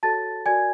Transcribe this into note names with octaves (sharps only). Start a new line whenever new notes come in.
F#4 A4 C#5 A5 A6
F#4 A#4 D5 G#5 G#6